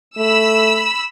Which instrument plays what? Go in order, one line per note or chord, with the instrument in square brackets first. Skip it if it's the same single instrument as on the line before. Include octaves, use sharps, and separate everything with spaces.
[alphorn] A3 [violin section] B5 E6